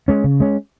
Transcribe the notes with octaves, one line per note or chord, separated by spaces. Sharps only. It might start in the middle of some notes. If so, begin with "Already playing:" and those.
G#3 C#4
C#3
G#3 C#4